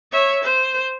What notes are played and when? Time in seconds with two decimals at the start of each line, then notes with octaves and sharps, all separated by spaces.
0.12 C#5 E5
0.44 C5